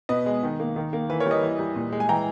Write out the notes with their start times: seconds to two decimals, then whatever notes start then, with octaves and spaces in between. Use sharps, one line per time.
0.09 B2 B4 D#5
0.26 G#3
0.43 D#3
0.60 A#3
0.76 D#3
0.93 A#3
1.10 E3 B4
1.20 A#4 C#5
1.26 G3
1.31 B4 D#5
1.42 E3
1.59 G3
1.76 A#2
1.92 G#3
2.00 G#5
2.09 E3 G5 A#5